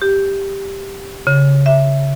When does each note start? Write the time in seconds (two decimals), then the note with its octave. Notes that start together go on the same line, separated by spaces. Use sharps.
0.02 G4
1.27 C#3
1.66 E5